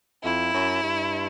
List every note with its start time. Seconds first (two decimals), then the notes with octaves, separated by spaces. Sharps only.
0.24 F2 E4
0.54 F#2
0.83 G2